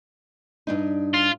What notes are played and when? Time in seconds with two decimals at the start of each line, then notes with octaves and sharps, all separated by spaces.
0.67 G2 D4 D#4
1.14 F4